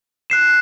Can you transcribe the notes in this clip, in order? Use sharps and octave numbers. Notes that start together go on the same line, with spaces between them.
F#6 C7 E7